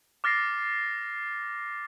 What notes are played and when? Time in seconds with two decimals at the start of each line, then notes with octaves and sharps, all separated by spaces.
0.24 D6 F6 A6 A#6 C7